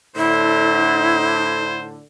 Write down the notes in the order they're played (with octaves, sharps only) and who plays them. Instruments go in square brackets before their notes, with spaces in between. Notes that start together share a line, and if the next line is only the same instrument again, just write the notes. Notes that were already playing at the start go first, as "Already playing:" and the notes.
[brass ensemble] A2 D3 [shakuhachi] E4 [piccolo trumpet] C5